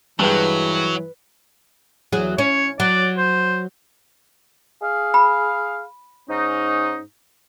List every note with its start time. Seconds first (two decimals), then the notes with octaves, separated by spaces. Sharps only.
0.20 G2 E3 F#3 G#3 B4 G5
2.12 E2 F#3 G#4
2.38 C#4 C#5
2.80 F#3 D5
3.18 C5
4.82 G#4 F5
5.14 B5
6.30 G#2 C#4 D#4